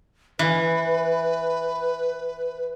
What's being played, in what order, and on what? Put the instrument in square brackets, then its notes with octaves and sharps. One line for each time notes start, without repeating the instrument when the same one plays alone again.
[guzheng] E3 [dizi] B4